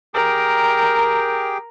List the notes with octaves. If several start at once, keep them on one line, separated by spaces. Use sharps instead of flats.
G4 G#4 A#4 G5